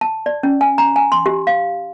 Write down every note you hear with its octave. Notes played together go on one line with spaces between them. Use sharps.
A5
D5
C#4
G#5
A#5
G#5
C6
G4
F5